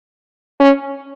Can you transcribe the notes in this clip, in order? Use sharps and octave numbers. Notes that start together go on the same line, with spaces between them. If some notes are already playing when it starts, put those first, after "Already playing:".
C#4